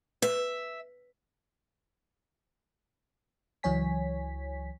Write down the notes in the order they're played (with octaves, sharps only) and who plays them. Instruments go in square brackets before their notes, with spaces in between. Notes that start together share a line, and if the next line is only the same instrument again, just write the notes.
[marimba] B4 [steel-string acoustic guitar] E5
[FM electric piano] C#2 E3 F#3 C#5 G#5 B6